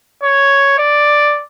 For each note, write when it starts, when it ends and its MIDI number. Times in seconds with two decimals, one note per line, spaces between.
0.23 0.78 73
0.78 1.43 74